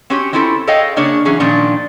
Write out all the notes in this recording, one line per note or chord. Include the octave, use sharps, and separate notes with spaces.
C4 C#4 F#4 G4 C#5
C4 C#4 E4 F4 G#4 A4
G#4 A4 C#5 D#5 F5 G5
C#3 A#3 D4 G#4 C#5
E3 F#3 C#4 G#4
A#2 D#3 F3 C#4 D4